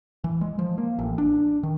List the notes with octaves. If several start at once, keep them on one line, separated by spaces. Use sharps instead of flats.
E3
G#3
F3
A#3
A1
D4
D#3